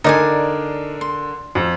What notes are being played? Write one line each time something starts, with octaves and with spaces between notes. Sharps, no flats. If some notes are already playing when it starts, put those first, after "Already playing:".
D3 D4 D#4 A#4 D5 G#5
C6
F2